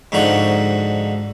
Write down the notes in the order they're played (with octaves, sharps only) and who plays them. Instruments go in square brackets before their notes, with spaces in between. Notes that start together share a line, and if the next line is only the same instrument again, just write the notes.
[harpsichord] G#2 D3 F3 D#4 F#4